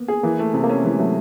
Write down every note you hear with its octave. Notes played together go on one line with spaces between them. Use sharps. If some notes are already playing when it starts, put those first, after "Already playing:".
Already playing: A#3 B3
G#4
E3 A#3
A3
C3
A#3
A3 C#4
E3 G#3
F#3 A3